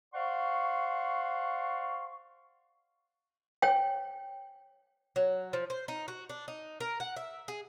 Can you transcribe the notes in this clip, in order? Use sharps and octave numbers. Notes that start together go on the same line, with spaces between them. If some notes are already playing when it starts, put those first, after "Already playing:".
C5 D5 F5 F#5 C6 C#6
C#5 G5
F#3
F3
C5
D#4
F#4
D4
D#4
A#4
F#5
E5
G#4